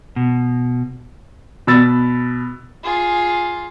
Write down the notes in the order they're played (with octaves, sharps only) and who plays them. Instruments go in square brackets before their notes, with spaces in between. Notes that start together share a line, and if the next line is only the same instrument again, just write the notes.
[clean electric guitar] B2
[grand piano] B2 B5 E6 A6
[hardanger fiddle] F4 G#4